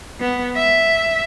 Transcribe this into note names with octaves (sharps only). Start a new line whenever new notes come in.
B3
E5